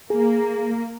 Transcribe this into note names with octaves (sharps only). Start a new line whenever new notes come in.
A#3 G#4